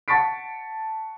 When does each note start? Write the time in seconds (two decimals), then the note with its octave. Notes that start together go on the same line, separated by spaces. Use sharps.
0.08 F#5 A5 C#6 A6 B6 D7